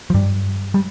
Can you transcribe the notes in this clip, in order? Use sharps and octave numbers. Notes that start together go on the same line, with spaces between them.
F3
G2 G3
G3